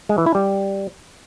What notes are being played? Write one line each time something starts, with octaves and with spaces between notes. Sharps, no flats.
G#3
E3
E4
G3